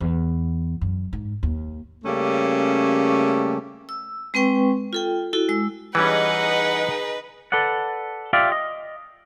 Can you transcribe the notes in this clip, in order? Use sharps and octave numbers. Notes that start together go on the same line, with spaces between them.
E2
F#2
G#2
D#2
C#3 G3 A3 A#3 C#4
E6
G#3 C4 B4 G5 C#6
F4 A4 G5
E4 F#4 A4
G#3 E6
E3 G3 C#4 D#4 G#4 B4 D#5 F#5
A4 B4 D5 F#5
F4 G4 D5 E5 F5
D#5